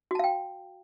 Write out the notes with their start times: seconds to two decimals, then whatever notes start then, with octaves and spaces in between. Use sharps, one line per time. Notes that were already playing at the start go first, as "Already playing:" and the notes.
0.11 F#4
0.15 A5
0.19 F5
0.24 G5